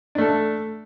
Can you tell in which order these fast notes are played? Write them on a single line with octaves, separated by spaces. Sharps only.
D4 A3 A4